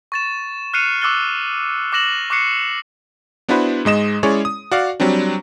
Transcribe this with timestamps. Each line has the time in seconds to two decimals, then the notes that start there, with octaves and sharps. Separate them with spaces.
0.12 C#6 A6 E7
0.74 F6 F#6 C7 C#7 D#7 F7
1.02 C#6 D6 E6 F#6 A6 G7
1.92 D6 F#6 A#6 E7 F#7
2.30 C#6 D6 F#6 C7 C#7
3.49 B3 D4 E4 F#4 B4 C5
3.85 G#2 G#3 D#5 E7
4.23 G#3 C#4 E4 G#4 C#5 D5
4.45 D#6
4.71 F#4 D5 F5
5.00 F#3 G3 C4 D4